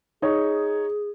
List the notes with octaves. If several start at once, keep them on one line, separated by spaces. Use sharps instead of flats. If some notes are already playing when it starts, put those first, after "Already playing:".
D#4 G#4 C#5